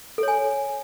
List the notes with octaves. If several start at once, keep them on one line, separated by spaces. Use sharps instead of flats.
A4 C#5 G#5